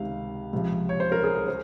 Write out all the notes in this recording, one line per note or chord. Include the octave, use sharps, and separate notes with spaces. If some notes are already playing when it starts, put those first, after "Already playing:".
Already playing: C#2 C3 D#3 F5
C#2 C3 F3
C#5
C5
A#4
G#4
A#4
C5